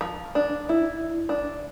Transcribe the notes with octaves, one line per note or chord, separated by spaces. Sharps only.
F3
D4
E4
D4